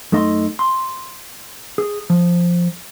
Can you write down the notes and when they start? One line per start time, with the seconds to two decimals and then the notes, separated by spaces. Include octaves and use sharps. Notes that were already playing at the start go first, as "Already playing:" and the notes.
0.12 F#2 A3 D#4 D#5 A#5 C6
0.59 C6
1.78 G#4
2.10 F3